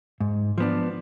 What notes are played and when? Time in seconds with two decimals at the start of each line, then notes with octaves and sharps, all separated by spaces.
0.20 G#2
0.58 F3 B3 D4